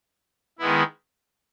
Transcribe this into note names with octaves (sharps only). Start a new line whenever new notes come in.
D#3 G#3 B3 E4